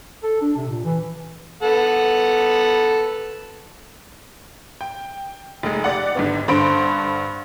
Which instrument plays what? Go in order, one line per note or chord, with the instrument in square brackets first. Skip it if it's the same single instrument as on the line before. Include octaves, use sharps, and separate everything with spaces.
[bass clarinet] A4
D4
C3
A#2
E3
[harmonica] B3 A4 F#5
[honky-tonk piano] G5
F1 G#3
G4 D5 F#5
G#1 D3 B3
G2 D3 C5 B5 C6 D7